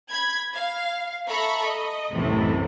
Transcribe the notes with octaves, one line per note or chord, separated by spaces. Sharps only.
B5 G#6
F5
A4 E5 A#5 B5 C#6
D#5
C2 F#2 A2 C3 E3 A3